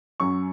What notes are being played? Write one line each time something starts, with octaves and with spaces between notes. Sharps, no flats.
F#2 F#3 C#4 C#6